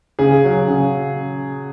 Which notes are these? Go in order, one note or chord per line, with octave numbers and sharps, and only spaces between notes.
C#3 G#4
F#3
C#3